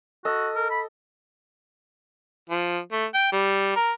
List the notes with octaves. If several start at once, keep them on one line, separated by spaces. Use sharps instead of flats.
F#4 A4 D#5
A#4
B5
F3
A3
G5
G3
A#4